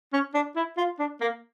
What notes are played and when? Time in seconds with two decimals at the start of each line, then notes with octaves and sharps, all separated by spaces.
0.13 C#4
0.34 D4
0.56 E4
0.77 F4
0.99 D4
1.21 A#3